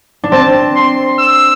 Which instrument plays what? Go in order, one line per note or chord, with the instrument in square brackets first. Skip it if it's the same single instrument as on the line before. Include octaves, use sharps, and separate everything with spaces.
[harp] D4
[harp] C4 [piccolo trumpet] A5
[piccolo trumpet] C6
E6